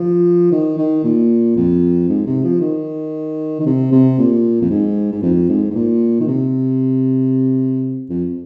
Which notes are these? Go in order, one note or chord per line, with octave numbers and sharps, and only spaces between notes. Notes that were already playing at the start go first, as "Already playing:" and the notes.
Already playing: F3
D#3
D#3
A#2
F2
G#2
C3
F3
D#3
D#3
C3
C3
A#2
F2
G#2
G#2
F2
G#2
G#2
A#2
D#3
C3
F2